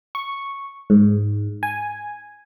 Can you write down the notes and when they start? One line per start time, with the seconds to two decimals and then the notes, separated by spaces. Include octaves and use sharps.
0.15 C#6
0.90 G#2
1.63 G#5